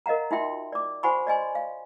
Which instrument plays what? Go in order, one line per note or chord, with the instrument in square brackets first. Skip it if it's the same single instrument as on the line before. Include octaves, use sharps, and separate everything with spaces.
[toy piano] A#4 D#5 F5 F#5 A#5
D#4 F4 F#4 E5 G5 C6
D5 D6
F#4 C5 F#5 G#5 B5 C#6
D5 D#5 G#5 C6
F5